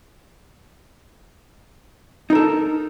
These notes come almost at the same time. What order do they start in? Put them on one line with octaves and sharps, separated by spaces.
D#4 A#4 A4